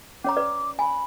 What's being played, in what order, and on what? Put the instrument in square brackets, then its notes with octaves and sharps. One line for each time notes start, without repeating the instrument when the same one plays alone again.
[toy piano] C#4 C#5 A#5 [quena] D6
[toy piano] B4 D5
[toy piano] G#5 [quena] B5